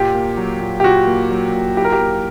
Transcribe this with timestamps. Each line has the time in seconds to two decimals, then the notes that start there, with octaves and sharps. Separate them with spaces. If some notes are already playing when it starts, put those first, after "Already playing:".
Already playing: A#2 G4
0.15 A#3
0.37 F#3
0.61 A#2
0.80 G4
0.84 A#2 F#4
1.07 A#3
1.31 F#3
1.54 A#2
1.77 E4 G4
1.84 A#4
1.92 G4
2.01 A#3